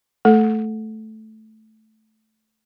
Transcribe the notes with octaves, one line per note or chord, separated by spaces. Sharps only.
A3 A4